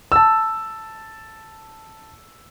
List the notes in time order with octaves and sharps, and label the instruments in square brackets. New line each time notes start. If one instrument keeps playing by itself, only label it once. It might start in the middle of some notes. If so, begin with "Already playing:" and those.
[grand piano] A5 E6